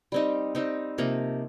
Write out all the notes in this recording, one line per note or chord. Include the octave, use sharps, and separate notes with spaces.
G3 C4 D#4
G3 C4 D#4
C3 F3 A#3 D#4